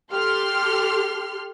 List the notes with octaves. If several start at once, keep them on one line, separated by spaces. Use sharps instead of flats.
G4 A4 C6 F6